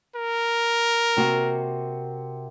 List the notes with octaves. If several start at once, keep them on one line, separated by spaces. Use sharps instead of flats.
A#4
C3 A#3 F#4